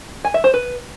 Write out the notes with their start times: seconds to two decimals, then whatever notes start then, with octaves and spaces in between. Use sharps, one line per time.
0.25 G#5
0.34 E5
0.44 C5
0.54 B4